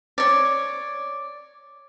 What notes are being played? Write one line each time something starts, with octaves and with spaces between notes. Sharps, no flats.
C#5 D5